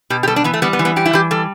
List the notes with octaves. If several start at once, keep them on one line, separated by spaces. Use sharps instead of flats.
B2 G4
G4
G3 A4
D4
E3 B3
A3
G3 B3
B3
E3
B3
G3 G4
E4
E3 G4
G3 A4